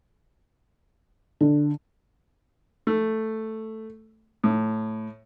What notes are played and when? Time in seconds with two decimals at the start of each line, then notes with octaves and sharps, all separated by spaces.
1.41 D3
2.87 A3
4.44 A2